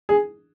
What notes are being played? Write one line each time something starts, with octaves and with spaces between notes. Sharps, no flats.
G#4